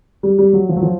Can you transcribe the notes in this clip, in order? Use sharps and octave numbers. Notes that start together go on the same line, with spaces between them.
G3
G3
F#3
F3
F#3
F3